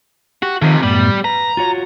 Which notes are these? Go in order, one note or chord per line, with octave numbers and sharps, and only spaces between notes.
F#4 G4
F2 C3 D#3
F#2 A2 G3 B3
B4 A#5
F4 F#4 C#5